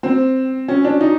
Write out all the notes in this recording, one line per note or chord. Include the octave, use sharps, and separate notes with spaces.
C4
C#4
D4
D#4